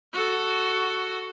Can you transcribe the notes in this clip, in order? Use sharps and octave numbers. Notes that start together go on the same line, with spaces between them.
F#4 A4